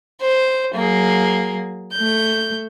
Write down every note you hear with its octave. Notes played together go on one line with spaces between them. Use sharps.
C5
F#3 A#3 G#4
A3 G6